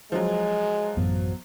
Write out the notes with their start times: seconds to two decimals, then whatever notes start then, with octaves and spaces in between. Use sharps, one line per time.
0.12 F3 F#3 G#3
0.97 A1 F#2 B3